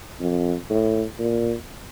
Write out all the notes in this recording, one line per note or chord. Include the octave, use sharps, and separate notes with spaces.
F2
A2
A#2